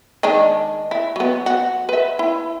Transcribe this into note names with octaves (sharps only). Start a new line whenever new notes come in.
D#3 G#3 D4
E4
F#3 B3
F#4
B4 E5
E4